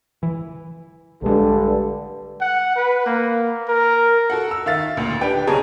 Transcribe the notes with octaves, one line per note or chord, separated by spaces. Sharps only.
E3
A#1 G2 D3 G#3
F#5
B4
A#3
A#4
F#4 A4 F#5
E6
D#3 E5 F5 A6
D2 A#2
D4 G4 B4 G5
B1 C#3 C#4 G#4 A5 A#5